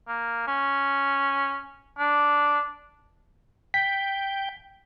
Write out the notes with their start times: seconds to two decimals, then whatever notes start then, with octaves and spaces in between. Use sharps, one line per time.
0.08 A#3
0.47 C#4
1.99 D4
3.74 G5 B6